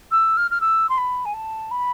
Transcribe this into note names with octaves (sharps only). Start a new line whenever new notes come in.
E6
F6
F6
E6
C6
B5
G#5
A5
B5